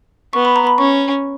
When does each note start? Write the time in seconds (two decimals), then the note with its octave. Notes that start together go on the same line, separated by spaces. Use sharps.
0.33 B3 C#6
0.45 B5
0.56 A#5
0.67 B5
0.78 C#4 C#6